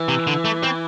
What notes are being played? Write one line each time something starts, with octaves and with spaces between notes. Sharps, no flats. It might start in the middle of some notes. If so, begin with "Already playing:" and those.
Already playing: E3
C3
D3
A3
C4